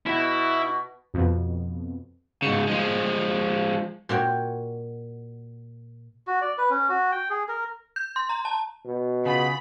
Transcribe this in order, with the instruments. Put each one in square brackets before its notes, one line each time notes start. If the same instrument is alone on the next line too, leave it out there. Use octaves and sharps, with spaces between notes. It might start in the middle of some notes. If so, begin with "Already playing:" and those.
[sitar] B2 [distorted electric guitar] E4 E5
[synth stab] F2 B2
[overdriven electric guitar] G#2 C#3 [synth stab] C#7
[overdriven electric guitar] F3 G#3
[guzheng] A#2 F#4 C#5 G5
[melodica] F#4
D5
B4
C#4
F#4
G5
G#4
A#4
[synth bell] G6
C6
A#5
A5
[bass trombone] B2
[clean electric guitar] C#3 [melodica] B3 F4 G#4 [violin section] B5